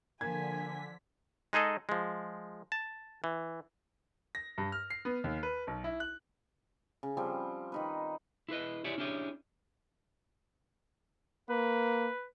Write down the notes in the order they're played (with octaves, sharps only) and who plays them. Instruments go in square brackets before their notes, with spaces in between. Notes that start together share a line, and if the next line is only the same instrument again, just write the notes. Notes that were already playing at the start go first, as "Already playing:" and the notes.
[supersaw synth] D3 B6 [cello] F3 [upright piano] A#3 G#6 [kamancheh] G#5
[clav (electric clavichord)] G#3 D#4 G#4 A4 D#5
F3 G#3
A5
E3
[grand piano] A#6
G2
F6
C7
B3
D#2
B4
B1
E4
F#6
[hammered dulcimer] C#3
F3 G3 C4
D#3 D#4 B4
[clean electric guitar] E4 G#4 B4 D#5
E4 G4 G#4 C#5 D5
C#4 D4 E4 G4 G#4 C#5
[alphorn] A#3 [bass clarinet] B4